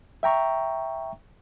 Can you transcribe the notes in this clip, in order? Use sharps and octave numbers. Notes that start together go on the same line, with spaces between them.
E5 G5 A#5 C#6